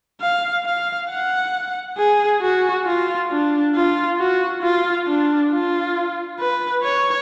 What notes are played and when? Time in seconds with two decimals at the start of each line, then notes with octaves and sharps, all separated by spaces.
0.22 F5
0.65 F5
1.10 F#5
1.98 G#4
2.42 F#4
2.86 F4
3.31 D4
3.75 F4
4.19 F#4
4.62 F4
5.08 D4
5.52 F4
6.39 B4
6.84 C#5